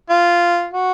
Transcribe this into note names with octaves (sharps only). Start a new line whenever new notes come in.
F4
F#4